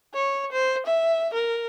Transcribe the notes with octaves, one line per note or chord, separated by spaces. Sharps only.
C#5
C5
E5
A#4